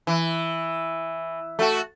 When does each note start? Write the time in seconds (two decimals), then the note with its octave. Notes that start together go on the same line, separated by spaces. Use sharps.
0.07 E3
1.59 A3 F#4